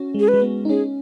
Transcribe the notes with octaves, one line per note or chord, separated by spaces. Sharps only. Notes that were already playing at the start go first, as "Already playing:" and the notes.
Already playing: C#4 F#4
G#3
G#4
B4
G#3
B3
D#4
C#4 G#4